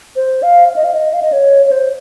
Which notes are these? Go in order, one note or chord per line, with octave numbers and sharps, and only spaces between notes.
C5
F5
F5
D#5
F5
D#5
F5
D#5
C#5
C#5
C5